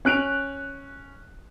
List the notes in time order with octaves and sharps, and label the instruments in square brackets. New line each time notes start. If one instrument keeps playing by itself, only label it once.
[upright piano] C#4 F#6 D7 F7